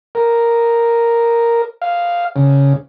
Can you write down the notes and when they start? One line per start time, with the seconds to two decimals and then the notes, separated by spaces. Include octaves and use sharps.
0.15 A#4
1.82 F5
2.36 C#3